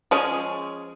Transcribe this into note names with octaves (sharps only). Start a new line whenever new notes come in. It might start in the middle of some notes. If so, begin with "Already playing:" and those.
F3 G#3 C#4 G#4